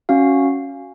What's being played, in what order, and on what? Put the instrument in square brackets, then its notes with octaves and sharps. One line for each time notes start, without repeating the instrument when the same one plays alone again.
[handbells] C#4 F#4 F5